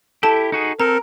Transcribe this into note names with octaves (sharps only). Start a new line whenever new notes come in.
E4 G4 A4 A5
D#4 F#4 G#4
C4 A4 A#4 A#5